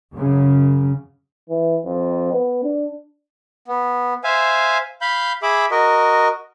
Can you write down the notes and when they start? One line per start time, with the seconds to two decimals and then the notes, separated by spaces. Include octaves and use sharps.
0.14 F#2 C#3
1.49 E3
1.85 F2
2.33 B3
2.63 D4
3.67 B3
4.24 C5 E5 F5 G#5
5.01 F5 B5 G6
5.42 G#4 E5 B5 D6
5.71 F#4 A#4 D#5